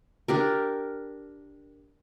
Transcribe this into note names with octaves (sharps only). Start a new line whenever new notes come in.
D4 G4 A#4